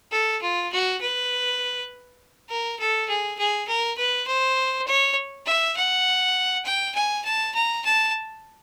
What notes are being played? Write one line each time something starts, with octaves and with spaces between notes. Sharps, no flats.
A4
F4
F#4
B4
A#4
A4
G#4
G#4
A#4
B4
C5
C#5
E5
F#5
G5
G#5
A5
A#5
A5